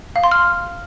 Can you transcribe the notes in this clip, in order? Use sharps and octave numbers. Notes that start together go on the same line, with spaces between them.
F5
C6
F6